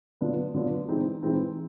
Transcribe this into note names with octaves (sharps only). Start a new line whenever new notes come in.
D3 F#3 B3 D4 F4
D3 F#3 B3 D4 F4
E3 G#3 C4 D#4
E3 G#3 C4 D#4